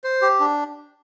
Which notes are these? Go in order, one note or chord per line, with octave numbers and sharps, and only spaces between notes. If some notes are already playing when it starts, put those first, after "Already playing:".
C5
G4
D4